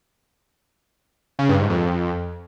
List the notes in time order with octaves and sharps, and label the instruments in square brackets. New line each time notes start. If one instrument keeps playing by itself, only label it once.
[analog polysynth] C#3
G2
G#2
F2